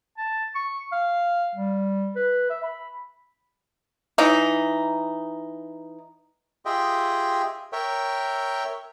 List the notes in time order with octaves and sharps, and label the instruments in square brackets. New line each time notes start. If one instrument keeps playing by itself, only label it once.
[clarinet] A5
C#6
F5
G3
B4
E5
B5
[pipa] E3 D#4
[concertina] F4 G4 G#4 D#5 E5 G5
A#4 C#5 E5 G5